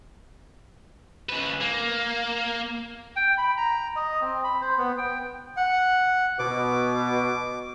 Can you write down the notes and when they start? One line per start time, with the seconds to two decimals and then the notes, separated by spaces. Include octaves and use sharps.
1.29 C#3 B4
1.61 A#3
3.16 G5
3.38 B5
3.57 A#5
3.96 D#5
4.21 C4
4.44 B5
4.61 C5
4.78 B3
4.98 G5
5.57 F#5
6.39 B2 D6